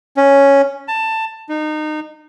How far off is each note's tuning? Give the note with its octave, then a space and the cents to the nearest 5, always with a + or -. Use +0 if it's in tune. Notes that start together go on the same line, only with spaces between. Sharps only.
C#4 +0
A5 +15
D#4 -25